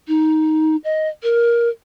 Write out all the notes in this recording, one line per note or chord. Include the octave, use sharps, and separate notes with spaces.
D#4
D#5
A#4